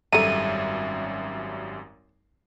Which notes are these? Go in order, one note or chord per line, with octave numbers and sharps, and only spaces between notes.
G#1 F#2 G3 A4 E5 A#5 D#7